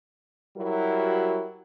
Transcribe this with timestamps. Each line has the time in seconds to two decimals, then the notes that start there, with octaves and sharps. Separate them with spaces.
0.57 F#3 G3 E4 F#4 A#4